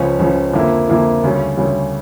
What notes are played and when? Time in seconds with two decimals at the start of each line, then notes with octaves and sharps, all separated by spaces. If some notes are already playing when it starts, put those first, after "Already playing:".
Already playing: C#2 C#3 F3 C#4
0.19 C#2 C#3 F3 C#4
0.53 F2 D3 F3 A#3 E4
0.89 F2 D3 F3 A#3 E4
1.23 D2 C#3 G3 C#4
1.57 D2 C#3 G3 C#4